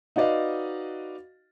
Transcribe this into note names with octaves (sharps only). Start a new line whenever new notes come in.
D#4 F#4 B4 D5 D#5 F5